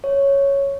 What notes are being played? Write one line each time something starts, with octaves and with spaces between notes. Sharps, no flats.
C#5